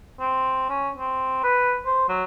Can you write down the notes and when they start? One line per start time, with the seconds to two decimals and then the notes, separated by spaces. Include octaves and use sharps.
0.20 C4
0.69 C#4
0.97 C4
1.43 B4
1.85 C5
2.08 F#3